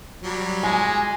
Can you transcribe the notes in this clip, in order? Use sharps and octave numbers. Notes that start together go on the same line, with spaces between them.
F#3 G3
G#3 G#5